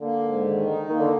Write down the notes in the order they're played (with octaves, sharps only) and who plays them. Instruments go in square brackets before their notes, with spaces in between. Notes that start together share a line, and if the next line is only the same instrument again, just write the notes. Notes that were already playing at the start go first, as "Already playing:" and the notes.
[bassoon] D3 [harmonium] A#3
[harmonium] G#2
D#3
D#4
[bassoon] D#3 [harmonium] A#3
[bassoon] D3